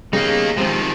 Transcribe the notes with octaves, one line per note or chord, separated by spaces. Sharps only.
C#3 G3 A#3 B3 D#4 F5
C3 D#3 F3 G#3 C4